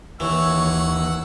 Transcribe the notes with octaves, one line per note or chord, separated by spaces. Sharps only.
D#2 E3 C#5 F#5 E6